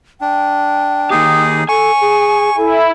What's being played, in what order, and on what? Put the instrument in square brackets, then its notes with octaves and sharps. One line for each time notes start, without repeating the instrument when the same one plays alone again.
[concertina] D4 [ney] G5
[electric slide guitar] D#3 A#3 G4 [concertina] D#4 G#4
[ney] A4 [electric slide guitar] G#5 [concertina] C#6
[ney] G#4
[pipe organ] E4 [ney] A4